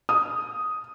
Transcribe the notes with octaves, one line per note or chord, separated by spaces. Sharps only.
D#6